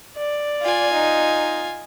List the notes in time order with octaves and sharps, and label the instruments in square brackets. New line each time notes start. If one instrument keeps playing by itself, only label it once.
[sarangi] D5
[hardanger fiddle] F4 G#5
[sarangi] D#4